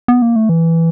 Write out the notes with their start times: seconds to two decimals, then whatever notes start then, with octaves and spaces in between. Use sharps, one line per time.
0.08 B3
0.22 A#3
0.36 A3
0.49 E3